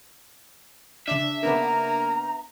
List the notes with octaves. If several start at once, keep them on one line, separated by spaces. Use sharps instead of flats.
C#3 D4 E5
C#3 A#3 B3 D4 A#5